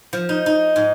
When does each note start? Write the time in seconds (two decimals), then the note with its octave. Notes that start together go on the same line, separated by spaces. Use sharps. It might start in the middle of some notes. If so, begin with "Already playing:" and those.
0.13 F3
0.29 D#4
0.46 D#4
0.76 G#2